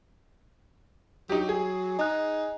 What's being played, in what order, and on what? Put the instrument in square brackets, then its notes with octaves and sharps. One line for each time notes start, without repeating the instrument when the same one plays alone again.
[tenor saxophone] F#3 [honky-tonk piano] D#4 G4
[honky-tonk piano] G#4
[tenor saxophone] D#4 [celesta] D#5 F#6